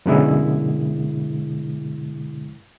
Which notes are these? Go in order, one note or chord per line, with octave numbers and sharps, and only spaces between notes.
F#2 B2 D3 G#3 E4